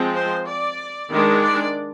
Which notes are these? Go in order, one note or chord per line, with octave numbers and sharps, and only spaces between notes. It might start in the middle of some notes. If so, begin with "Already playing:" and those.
Already playing: F3 G#3 C4
C5
D5
D#3 G#3 D4
D5